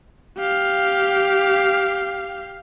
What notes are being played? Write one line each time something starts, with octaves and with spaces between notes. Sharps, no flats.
G4 F5